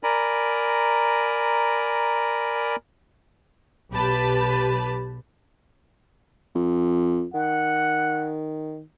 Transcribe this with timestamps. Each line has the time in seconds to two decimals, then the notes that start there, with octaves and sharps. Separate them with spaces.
0.03 A#4 D5 G#5 A#5 B5
3.91 B1 G4 B4 A5 B5
6.55 F2
7.34 D#3 F#5